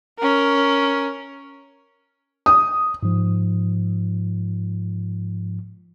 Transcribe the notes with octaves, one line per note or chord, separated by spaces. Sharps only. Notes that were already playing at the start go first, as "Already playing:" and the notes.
C#4 A#4
D#6
G#2 F3